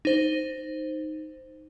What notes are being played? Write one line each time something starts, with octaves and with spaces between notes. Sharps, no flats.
D#4 C5